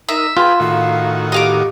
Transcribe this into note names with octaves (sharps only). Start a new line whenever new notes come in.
D#4 A#4 D#5 E5
F4 G#4 B4 G5 C6
A2 D#3 F#4 F5
G4 D#5 F5 D6